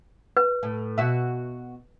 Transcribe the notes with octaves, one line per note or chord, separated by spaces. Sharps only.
B4
A2
B2 F#4 E5